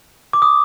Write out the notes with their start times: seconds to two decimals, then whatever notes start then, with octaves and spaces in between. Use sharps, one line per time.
0.33 D6
0.42 D#6